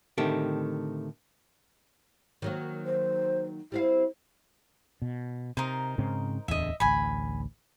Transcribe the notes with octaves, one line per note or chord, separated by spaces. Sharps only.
A2 D3 D#3 A3 C4 G4
D#3 F#3 A#3
C5
G3 C4 E4 F5
B2
C3 D#4 A#4 C5
G#2 C#3 C4
D1 E2 D3 D#5 E5
A1 D2 G#5 B5